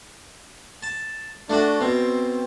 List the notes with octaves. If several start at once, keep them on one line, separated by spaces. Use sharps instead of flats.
A5
A3 D4 F#4
B2 C4